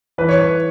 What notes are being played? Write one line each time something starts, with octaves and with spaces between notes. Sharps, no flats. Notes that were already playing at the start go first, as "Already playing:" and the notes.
E3 B4
C#5
B4